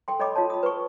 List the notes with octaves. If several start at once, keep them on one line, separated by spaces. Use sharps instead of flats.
A4 G5 C6
A4 C#5 D#5 B5 D6
F4 A4 C#5 A5
B5 D#6
B4 C#6